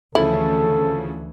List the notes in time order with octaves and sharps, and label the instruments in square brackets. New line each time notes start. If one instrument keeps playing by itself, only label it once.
[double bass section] D2 E3 [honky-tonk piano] C#3 F3 A3 [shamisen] E4 [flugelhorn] A4